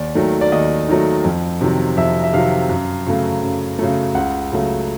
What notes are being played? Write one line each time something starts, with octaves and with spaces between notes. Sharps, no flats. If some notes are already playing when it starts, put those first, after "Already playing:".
Already playing: D#2 D5
D#3 F#3 A3
D5
D#2 D#5
D#3 F#3 A3
F2
C3 D#3 F#3
F2 E5
E5
C3 D#3 F#3 F5
F#2
C#3 F#3 A3
F#2
C#3 F#3 A3
C#2 F#5
C#3 F#3 A3